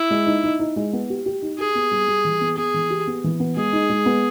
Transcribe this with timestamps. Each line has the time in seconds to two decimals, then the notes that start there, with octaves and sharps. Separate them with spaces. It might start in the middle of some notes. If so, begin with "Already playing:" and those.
Already playing: E4
0.11 G#3
0.26 D#4
0.44 D#4
0.59 D#4
0.76 G#3
0.93 B3
1.10 G4
1.26 G4
1.42 D#4
1.58 G4 G#4
1.75 B3
1.91 G3
2.08 G3
2.25 E3
2.41 B3
2.57 B3 G#4
2.74 E3
2.90 G4
3.07 B3
3.24 E3
3.40 B3
3.56 G#3 G#4
3.73 D#4
3.90 G#3
4.06 B3